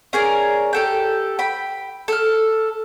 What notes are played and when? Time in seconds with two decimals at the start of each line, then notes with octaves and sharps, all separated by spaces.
0.13 C#4 G#4 A#4 D5
0.73 G4 A4 G5
1.39 G5 B5
2.08 A4 F6